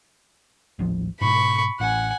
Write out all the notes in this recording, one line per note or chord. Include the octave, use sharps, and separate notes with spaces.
D#1 A1 F3
G#2 B2 B5 C#6
A1 F#5 G#5